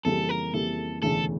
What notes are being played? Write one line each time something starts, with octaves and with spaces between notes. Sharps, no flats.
F2 C#3 E3 G3 A#3 A4
A#4
F2 C#3 E3 G3 A#3 A4
E1 D2 C#3 E3 A3 A4